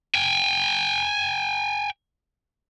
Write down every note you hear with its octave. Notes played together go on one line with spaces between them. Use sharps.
G5 G#5